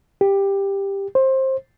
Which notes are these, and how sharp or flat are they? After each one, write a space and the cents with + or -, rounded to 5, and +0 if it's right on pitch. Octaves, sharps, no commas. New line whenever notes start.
G4 +10
C5 +20